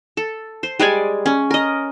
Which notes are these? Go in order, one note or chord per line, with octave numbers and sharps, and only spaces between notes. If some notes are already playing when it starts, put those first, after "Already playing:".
A4
C5
G3 G#3 D5 G#5
C#4
A#4 D#5